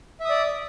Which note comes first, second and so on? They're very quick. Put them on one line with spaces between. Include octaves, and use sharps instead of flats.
E5 D#6 D5